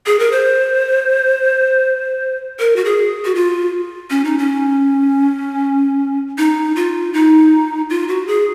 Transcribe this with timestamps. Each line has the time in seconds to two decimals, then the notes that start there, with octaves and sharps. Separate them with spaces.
0.06 G#4
0.19 A#4
0.32 C5
2.59 A#4
2.76 F#4
2.85 G#4
3.25 F#4
3.35 F4
4.10 C#4
4.25 D#4
4.38 C#4
6.38 D#4
6.76 F4
7.13 D#4
7.90 F4
8.08 F#4
8.27 G#4